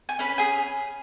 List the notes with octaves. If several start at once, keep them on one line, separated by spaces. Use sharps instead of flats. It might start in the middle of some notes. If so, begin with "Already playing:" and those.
G#5
C#4 B4 B5
G#4 G#5